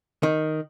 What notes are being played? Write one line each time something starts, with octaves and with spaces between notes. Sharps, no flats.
D#3